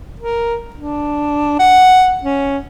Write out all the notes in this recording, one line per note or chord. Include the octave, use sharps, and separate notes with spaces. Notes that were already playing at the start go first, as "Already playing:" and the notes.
A#4
D4
F#5
C#4